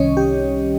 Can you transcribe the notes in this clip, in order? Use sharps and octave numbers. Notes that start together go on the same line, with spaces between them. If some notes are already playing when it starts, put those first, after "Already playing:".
Already playing: C2 C3 D#3 G3 C#4 C#5 D#5
G4